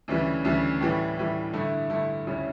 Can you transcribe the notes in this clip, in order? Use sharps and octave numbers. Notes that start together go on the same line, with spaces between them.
D2 C#3 E3 G3
D2 C#3 E3 G3
A2 E3 G3
A2 E3 G3
G2 D3 A3 E4
G2 D3 A3 E4
D2 C#3 G3 C#4 E4